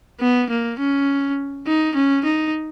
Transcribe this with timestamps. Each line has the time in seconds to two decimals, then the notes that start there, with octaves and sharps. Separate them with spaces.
0.20 B3
0.50 A#3
0.79 C#4
1.67 D#4
1.95 C#4
2.25 D#4